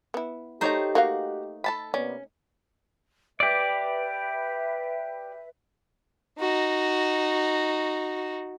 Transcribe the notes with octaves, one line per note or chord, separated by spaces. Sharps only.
B3 E4
A3 D#4 G4 A#4 C5 C#5 A#5
A#3 F#4 D#5 F5
A4 A5 B5
C3 A#3 B3 C#4 D5
G4 B4 D5 E5
D#4 F#4